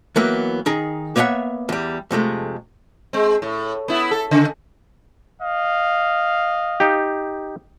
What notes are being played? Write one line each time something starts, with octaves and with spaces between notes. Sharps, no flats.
E3 F#3 A#3 B3
D#3 D#4 G#4 A#5
A#3 B3 C#5 D5 E5 F#5
E2 G3
F2 C3 G#3 A3
G#3 C4
A2
B3 E4
A4
C#3
D#5 F5
D#4 G4